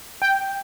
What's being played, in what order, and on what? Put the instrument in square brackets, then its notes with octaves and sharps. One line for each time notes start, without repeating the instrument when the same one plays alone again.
[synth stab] G5